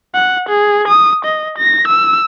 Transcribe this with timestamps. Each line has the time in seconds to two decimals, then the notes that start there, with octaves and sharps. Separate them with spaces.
0.14 F#5
0.49 G#4
0.88 D#6
1.25 D#5
1.58 A#6
1.88 E6